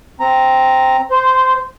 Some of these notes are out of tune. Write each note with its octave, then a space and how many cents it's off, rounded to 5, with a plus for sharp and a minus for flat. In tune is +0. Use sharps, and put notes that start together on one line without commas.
C4 +0 A#5 +0
C5 -15 C6 +0